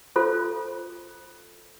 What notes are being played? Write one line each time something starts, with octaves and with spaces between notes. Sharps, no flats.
F4 A4 C5